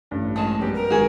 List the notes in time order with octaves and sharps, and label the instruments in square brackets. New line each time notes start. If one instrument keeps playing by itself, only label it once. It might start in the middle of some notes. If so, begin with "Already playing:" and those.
[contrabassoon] A1 [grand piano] G2
[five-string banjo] F#3 G#3 [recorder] A5
[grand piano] F#2 G3 B3 [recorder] G4
[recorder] A#4
[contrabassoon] G#1 [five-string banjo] F#4 G#4